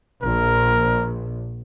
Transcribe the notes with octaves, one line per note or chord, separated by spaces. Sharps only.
A#1 A#4